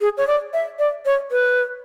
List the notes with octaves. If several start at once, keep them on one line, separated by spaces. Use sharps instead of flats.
G#4
C#5
D5
E5
D5
C#5
B4